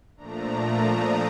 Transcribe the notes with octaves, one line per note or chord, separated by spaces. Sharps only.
A#2 F3 A3 D4 A#5
D#6